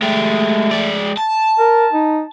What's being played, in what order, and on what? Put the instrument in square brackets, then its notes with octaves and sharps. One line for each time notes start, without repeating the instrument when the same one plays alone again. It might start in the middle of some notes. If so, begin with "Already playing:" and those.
[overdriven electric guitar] G#3 G4 [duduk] A3
[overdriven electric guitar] G#3 D5
A5
[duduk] A#4
D#4